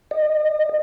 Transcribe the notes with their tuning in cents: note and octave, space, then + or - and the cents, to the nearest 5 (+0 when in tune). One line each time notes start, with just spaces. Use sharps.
D#5 -25